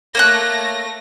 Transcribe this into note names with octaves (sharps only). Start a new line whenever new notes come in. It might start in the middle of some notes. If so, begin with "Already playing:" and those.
A3 A#3 C#5 F#6 A#6